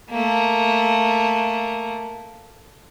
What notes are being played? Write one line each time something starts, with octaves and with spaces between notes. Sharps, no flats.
A3 A#3